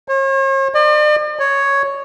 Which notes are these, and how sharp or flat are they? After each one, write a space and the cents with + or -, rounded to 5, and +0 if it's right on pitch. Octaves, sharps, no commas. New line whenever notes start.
C#5 -45
D5 +45
C#5 +0